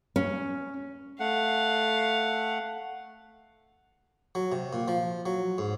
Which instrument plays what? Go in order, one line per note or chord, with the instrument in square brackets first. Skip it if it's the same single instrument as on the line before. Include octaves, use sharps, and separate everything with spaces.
[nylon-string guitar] C#4
[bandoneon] A3 F#5 [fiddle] F5
[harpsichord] F#3
C3
A#2
F3
F#3
G#2